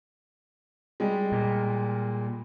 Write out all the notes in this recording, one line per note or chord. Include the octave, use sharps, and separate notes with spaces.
G3 G#3
A#2